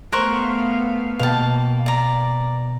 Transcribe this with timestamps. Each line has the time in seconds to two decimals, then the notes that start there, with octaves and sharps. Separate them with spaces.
0.12 A3 B3 A#4 C5 F5 C#6 F#6
1.19 B2 A#3 B3 F5 G5 A5
1.86 D5 A#5